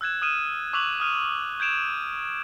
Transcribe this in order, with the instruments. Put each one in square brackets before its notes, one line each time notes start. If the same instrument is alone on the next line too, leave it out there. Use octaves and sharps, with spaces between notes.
[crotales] E6 F#6 G#6 E7
D#6 F6 D#7 E7
C#6 D6 E6 F#6 F7 F#7
D#6 F6 D#7 F7
G6 G#6 D7 E7 F7